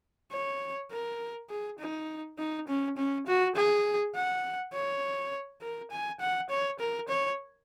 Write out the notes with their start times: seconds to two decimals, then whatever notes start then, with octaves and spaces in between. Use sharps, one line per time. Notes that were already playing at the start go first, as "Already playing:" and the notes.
0.32 C#5
0.92 A#4
1.50 G#4
1.79 D#4
2.39 D#4
2.68 C#4
2.97 C#4
3.27 F#4
3.56 G#4
4.15 F#5
4.73 C#5
5.62 A#4
5.91 G#5
6.20 F#5
6.50 C#5
6.79 A#4
7.08 C#5